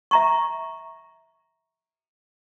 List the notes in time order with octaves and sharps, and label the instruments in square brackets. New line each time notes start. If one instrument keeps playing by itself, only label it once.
[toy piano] E5 A#5 C#6